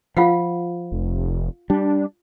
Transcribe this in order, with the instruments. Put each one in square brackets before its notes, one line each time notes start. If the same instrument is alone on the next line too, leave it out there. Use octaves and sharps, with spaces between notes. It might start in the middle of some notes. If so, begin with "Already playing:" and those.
[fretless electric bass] F3 [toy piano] F4 F5 F#5
[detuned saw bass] F1
[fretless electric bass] G3 [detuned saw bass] D4